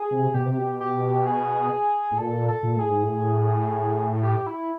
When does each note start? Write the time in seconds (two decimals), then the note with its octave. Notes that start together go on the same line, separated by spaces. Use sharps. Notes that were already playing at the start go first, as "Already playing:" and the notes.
Already playing: G#4
0.11 C3
0.34 B2 G4
0.46 C3
0.58 B2
0.80 G4
1.26 G#4
2.11 A2
2.18 A#2 A4
2.48 A4
2.63 A#2
2.76 A2 G#4
2.89 G#2
3.03 A2
4.23 G4
4.46 E4